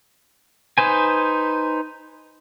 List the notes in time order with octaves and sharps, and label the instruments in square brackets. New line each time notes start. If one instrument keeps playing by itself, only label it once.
[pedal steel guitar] D#4 B4 C5 G#5